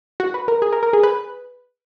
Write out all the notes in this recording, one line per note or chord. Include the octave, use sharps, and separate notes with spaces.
F#4
B4
A#4
G#4
A#4
A#4
G#4
B4